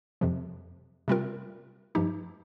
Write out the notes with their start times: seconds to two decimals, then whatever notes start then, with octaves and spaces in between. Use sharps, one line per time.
0.21 F2 C3 F3
1.08 C3 G3 C4 F4 A#4
1.95 G2 F3 D#4 G4